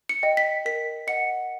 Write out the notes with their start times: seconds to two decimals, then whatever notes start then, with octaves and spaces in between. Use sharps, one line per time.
0.09 C#7
0.23 D#5 G5
0.37 B6
0.65 A#4 B6
1.07 D#5 F#5 C#7